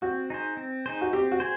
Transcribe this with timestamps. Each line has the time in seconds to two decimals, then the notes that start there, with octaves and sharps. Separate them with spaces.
0.02 C4 F#4
0.30 D#4 G#4 C5
0.57 C4
0.86 D#4 G#4 C5
1.01 F#4
1.13 C4 G4
1.31 F#4
1.40 G#4 C5